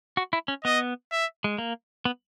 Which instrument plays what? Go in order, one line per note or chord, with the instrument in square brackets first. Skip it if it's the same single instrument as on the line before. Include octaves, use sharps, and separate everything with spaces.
[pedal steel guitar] F#4
E4
C#4
[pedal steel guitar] B3 [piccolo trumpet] D#5
[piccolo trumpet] E5
[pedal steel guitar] G#3
A#3
B3